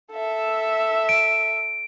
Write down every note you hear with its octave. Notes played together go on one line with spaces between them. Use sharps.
A4 E5
D7